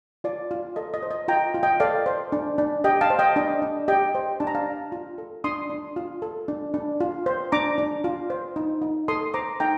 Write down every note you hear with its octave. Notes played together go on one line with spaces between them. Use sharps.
F4 D5
F4
A4 D#5
D#5
C5
D#5
F4 G5 A#5
F4
D#5 G5
A4 D5 F5
C5
D4
D4
G4 D#5 G5
F5 A5
C5
D#5 G5
D4 D#5
D4
G4 D#5 G5
C5
D4 A5
A#5
F5 A5
D4
F4
A4
D4 C6 D#6
D4
F4
A4
D4
D4
F4
C5
D4 A#5 D6
D4
F4
C5
D#4
D#4
A4 C6 D#6
C5 A#5 D6
D#4 G5 A#5